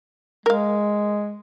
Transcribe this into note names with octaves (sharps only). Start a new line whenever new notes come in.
G#3 A#4 F5